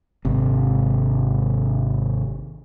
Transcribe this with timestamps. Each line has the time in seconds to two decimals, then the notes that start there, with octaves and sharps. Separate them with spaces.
0.25 G#1 C3